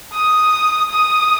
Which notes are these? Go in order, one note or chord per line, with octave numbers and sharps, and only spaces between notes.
D#6
D#6